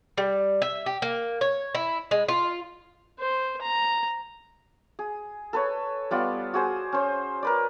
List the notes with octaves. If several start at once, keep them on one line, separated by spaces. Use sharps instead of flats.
G3
E5
G4
A#3
C#5
E4
G#3
F4
C5
A#5
G#4
A4 B4 C#5
G3 B3 F4 D5
F#4 G#4 C5
C#4 C5
A#4 B4 D5